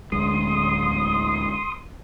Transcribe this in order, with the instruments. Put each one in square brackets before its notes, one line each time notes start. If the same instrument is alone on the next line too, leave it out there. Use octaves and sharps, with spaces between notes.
[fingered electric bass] D1 D2 G#3 [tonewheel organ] C6 D#6